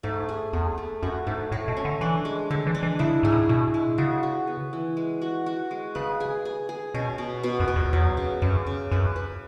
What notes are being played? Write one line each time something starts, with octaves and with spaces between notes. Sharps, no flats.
G#2 A3
G#4
E2 G#4
A3
F#2 F#4
G#2 A3
A2 A3
B2
C#4
D3
E3 D4
G#3
D3 G#3
E3
D4
E3
C#3 E4
G#2 G#4
A2
B2 E4
G#3
C#3 F#4
F#4
B3
E3
G#3
F#4
F#4
G#3
C#3 B4
G#4
G#4
G#4
B2 C#4
B2
B2
F#2
B2
E2
E2 F#3
C#3
F#2 C#3
C#3
F#2 B4
B4